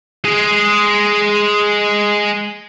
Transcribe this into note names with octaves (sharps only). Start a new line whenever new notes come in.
G#3 G#4